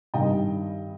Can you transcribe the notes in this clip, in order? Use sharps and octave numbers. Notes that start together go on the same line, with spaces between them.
G2 D#3 G3 D#5 G5